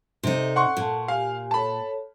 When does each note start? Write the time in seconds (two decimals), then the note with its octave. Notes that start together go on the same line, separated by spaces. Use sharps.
0.23 C3 D#4 A4 D5
0.56 F#5 C6 C#6
0.77 A#2 A4 A5
1.08 G4 F5 G#5
1.51 A4 C#5 A5 B5